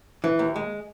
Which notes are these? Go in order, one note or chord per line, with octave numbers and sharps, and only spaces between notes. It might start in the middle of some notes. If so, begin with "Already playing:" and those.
E3
D#2
G#3